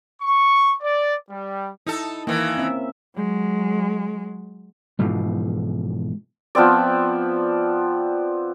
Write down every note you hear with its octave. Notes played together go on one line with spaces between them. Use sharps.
C#6
D5
G3
D#4 E4 A4
D#3 E3 A#3
C4 C#4 E5
F#3 G#3
G#2 B2 E3 F3
F3 B3 C4 D5